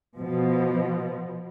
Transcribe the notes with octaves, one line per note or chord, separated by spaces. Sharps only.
B2 F3